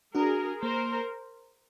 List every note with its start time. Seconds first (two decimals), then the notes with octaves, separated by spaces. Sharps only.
0.14 D4 F#4 G#4 A#4
0.62 A#3 A#4 C5